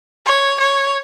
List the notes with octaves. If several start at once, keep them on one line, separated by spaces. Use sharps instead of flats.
C#5
C#5